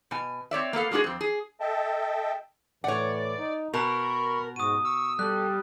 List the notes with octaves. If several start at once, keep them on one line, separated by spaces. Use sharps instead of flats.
B2 G#5
C4 C#5 D5 E5
A#3 B3 A4 F5
F#3 G#3 A3 D4 F#4 G#4
F2 C4
G#4
A4 D#5 E5 G5 A5
A2 E3 C#5 D5 F#5
D#4
B2 A#4 A#5 B5 C#6 F7
G#2 F#4 D#6 D#7
C#6 E6
G3 A4 F#6